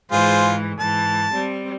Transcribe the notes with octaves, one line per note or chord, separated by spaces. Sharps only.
G#2 E3 F4 G#4 C5
G#2 E3 A5
G3 C4